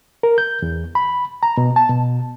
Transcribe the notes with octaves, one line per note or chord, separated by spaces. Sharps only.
A#4
G6
E2
B5
A#5
B2
A5
B2